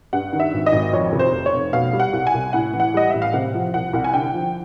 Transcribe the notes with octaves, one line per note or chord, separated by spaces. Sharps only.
G2 F#5
D#3
E5
G#1
D#5
G#1
F2 C#5
C3
C5
F1
C#5
F1
B2 F5
G3
F#5
C2
G#5
C2
A2 F#5
E3
F#5
G3 D#5
A1 E5
F5
C3 F#5
F3
C2 F#5
C2
G#5
D3 G5
F3